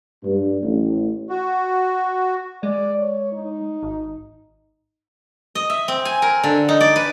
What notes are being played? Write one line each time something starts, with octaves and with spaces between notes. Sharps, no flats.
G2
A1
F#4
G#3 D5
C#5
D#4
G#1
D#5
E5
C4
G#5
A#4
D3
D#4
D5
B4